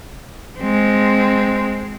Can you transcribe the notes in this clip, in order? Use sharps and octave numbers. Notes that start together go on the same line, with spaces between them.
G#3 C4